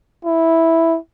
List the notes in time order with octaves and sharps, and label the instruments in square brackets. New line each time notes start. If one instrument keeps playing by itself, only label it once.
[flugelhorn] E4